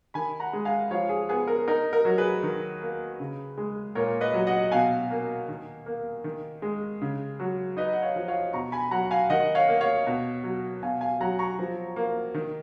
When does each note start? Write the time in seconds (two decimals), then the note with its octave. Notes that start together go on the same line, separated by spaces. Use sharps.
0.14 D#3 G#5 B5
0.40 F#5 A#5
0.53 G#3
0.65 F5 G#5
0.91 F3 C#5 F5
1.09 G#4
1.29 B3 G#4
1.47 A#4
1.68 D#4 A#4
1.93 A#4
2.05 F#3
2.18 G#4 B4
2.43 D#3
2.82 A#3
3.20 C#3
3.58 G#3
3.95 A#2 A#4 C#5
4.21 B4 D#5
4.34 F#3
4.47 D#5 F#5
4.72 B2 F5 G#5
5.10 A#3
5.48 D#3
5.86 A#3
6.24 D#3
6.62 G#3
7.02 C#3
7.40 F#3
7.77 D#4 B4 D#5
7.93 F#5
8.02 C#5 F5
8.16 F3
8.28 C#5 F5
8.53 B2 A#5 C#6
8.72 G#5 B5
8.91 F#3 F#5 A#5
9.11 F5 G#5
9.30 D#3 D#5 F#5
9.55 C#5 F5
9.68 A#3
9.81 C#5 F5
10.07 B2
10.44 F#3
10.82 B2 F5 G#5
11.01 F5 G#5
11.20 F#3 F#5 A#5
11.39 A#5 C#6
11.59 F3
11.96 A#3
12.34 D#3